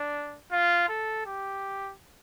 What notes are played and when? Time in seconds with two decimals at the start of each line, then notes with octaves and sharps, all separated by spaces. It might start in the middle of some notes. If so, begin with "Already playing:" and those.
Already playing: D4
0.52 F4
0.89 A4
1.26 G4